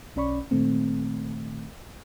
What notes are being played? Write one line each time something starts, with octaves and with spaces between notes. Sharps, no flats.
B1 C#4 D5 B5 C#6
A#2 D#3 A3 C4